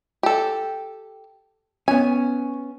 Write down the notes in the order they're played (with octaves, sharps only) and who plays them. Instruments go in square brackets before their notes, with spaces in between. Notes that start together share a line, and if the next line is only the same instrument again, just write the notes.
[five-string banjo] G4 A4
[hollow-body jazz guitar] B3 C#4 [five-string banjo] G#5